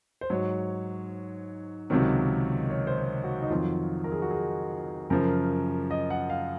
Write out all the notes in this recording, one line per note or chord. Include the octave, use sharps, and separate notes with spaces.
C5
G#2 F#3 C#5
C#2 C3 D#3 F#3
C#5
C5
C#5
F#4
D#4
F2 D#3 F#3 F4
A#4
G#4
F#4
G#4
F#2 C#3 F3 A#4
D#5
F#5
F5